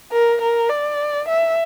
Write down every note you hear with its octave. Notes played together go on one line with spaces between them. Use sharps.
A#4
A#4
D5
E5